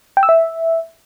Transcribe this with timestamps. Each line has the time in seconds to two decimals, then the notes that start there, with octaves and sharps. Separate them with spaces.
0.17 G5
0.23 E6
0.29 E5